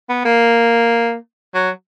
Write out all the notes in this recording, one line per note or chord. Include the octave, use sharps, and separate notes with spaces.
B3
A#3
F#3